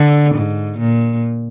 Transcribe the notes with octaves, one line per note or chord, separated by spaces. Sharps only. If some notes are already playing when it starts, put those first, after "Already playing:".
Already playing: D3
G#2
A#2